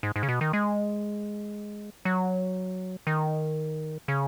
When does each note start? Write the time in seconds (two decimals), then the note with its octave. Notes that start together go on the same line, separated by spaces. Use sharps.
0.03 G#2
0.16 G#2
0.23 C#3
0.28 B2
0.41 D#3
0.53 G#3
2.05 F#3
3.07 D#3
4.08 C#3